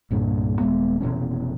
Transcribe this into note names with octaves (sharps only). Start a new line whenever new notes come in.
C2 G2 A#2 D4
D#1 G#2 G#3 B3
F1 B2 E3 C#4